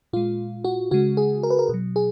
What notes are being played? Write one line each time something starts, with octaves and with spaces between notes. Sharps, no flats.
A#2 G#3 F4
F#4
C#3 G#3 F#4
G#4
A#4
B4
A#4
B2 F#3
G#4